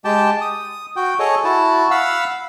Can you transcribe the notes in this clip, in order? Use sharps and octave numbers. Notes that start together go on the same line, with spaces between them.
G#3 G4 G5 A5
D#6
F#4 G5
G#4 A4 C#5 D#5
E4 F#4 A5
F5 F#5 B5 E6